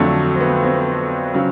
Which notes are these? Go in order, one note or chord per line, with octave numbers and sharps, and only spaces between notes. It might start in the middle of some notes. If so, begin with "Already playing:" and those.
Already playing: F2 D3 F#3 A3
C4
B3
C4
C#3 F#3